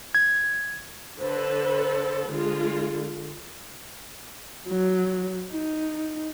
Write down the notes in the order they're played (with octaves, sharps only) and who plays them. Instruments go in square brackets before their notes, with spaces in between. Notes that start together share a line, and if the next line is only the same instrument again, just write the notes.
[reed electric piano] G#6
[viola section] D3 A4 B4 [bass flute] C5
[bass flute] D3 [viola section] G#3 F4
[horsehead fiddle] F#3
D#4